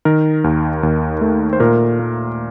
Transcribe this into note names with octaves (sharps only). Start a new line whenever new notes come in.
D#3 A#4
D#2
D#2
A3
C5
A#2 A#4
A#3